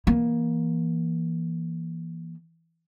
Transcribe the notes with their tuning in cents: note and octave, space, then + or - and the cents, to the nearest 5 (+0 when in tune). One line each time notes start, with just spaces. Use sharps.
E3 +15 A#3 +20